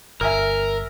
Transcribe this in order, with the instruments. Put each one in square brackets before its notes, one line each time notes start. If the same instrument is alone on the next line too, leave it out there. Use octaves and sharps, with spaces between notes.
[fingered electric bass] G1 [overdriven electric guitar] A#4 [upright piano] E5 G#5 F6